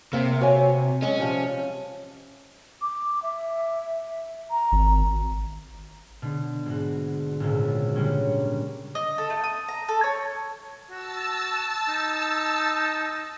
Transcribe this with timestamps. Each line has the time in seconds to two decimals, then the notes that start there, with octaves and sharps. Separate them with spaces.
0.13 C3 A#3 E5 G5
0.41 F#4 C#5 G#5
1.02 F#3 G#3 C#4 D#5
1.20 C3 F3 G3
2.82 D6
3.23 E5
4.50 A#5
4.72 G#1
6.22 B2 D3
6.66 G#1 F#4
7.40 G#1 C#2 A#2
7.95 D3 G3 A#3 C#4
8.95 D#5
9.18 A4
9.30 A3
9.43 D#6
9.68 A#5
9.88 A4
10.04 C#5
10.90 F#4 A5 E6
11.89 D#4